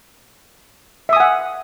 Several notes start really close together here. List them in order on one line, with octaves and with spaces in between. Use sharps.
E5 D#6 G#5 F#5